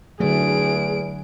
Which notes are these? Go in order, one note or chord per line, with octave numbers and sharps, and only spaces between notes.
E2 D3 F#3 A3 G#4 D7